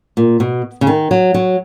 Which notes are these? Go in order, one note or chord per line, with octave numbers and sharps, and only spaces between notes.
A#2
B2
C#3
D#3
F#3
F#3